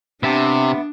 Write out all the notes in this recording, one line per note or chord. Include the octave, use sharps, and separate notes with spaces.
C3 B3 D4 E5 A5